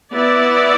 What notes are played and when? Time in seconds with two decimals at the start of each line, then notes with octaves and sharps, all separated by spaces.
0.13 B3 E4 D5